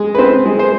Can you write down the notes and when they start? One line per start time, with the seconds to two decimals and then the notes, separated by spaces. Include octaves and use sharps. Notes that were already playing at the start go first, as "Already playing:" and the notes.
Already playing: G#3
0.15 B4
0.18 C4 C5
0.46 G#3
0.59 C5